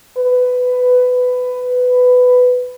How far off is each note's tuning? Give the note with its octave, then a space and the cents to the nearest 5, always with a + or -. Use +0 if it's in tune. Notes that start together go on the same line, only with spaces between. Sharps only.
B4 +15